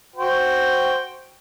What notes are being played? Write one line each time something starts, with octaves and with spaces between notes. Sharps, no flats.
F#4 C5 G5